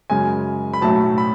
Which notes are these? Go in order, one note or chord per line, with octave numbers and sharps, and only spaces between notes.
F#2 C#3 G#3 G#5
B5
B1 A2 F#3 A3 A5
B5